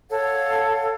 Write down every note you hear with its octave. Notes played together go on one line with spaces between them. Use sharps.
A4 C#5 F5 F#5